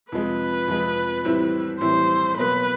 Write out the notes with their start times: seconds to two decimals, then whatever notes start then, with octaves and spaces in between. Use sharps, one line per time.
0.12 F2 C3 F3 G#3 B4
0.68 F2 C3 F3 G#3
1.25 A2 E3 G3 C4 E4
1.80 A2 E3 G3 C4 E4 C5
2.37 B2 F#3 A#3 B4